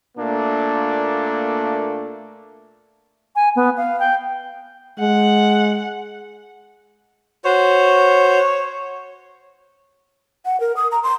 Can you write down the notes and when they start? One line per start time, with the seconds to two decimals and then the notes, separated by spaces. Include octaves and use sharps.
0.17 A#2 A3 A#3 D4
3.36 G#5
3.56 B3
3.77 F5
4.00 G5
5.00 G#3 F#5
7.45 F#4 C5 C#5
10.45 F#5
10.60 A#4
10.77 D#6
10.92 A#5
11.03 C6